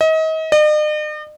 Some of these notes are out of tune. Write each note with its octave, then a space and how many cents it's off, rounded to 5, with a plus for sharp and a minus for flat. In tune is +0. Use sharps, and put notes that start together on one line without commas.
D#5 +35
D#5 -45